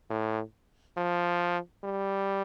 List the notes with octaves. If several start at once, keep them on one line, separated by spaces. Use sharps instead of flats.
A2
F3
G3